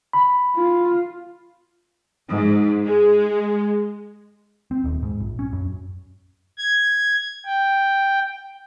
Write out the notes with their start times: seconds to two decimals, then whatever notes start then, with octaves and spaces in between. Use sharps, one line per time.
0.13 B5
0.56 F4
2.29 G#2
2.85 G#3
4.71 C4
4.84 D#1
5.03 G#2
5.20 A#1
5.39 C#4
5.53 F#2
6.58 G#6
7.46 G5